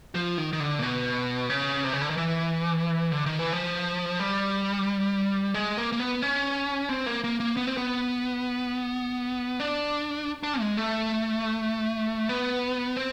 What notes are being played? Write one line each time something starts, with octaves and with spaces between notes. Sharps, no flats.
F3
D#3
D#3
D3
A#2
B2
C#3
C3
C#3
D3
D#3
E3
D3
D#3
E3
F3
G3
G#3
A#3
A#3
B3
C#4
C4
A#3
A#3
A#3
B3
C4
B3
D4
D4
G#3
A3
B3
C4